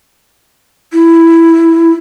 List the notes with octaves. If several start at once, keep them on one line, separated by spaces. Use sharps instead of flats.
E4